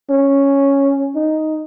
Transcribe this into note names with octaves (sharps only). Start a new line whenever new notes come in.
C#4
D#4